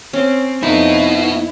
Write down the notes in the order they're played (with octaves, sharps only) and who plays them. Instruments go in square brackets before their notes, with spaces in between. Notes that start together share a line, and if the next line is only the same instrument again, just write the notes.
[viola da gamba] C4 [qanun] C#4
[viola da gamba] F2 B4 [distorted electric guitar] B3 F#4 [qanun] D#4 [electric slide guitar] E4